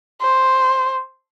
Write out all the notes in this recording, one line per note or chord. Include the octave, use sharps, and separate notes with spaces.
C5